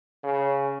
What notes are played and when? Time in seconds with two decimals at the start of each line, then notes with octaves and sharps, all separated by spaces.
0.24 C#3